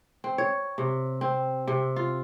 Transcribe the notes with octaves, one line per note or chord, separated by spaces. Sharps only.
C4
C#5
C3
C4
C3
F4